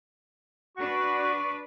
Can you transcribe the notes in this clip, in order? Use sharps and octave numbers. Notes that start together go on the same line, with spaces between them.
D4 F#4 B4 D5 C#6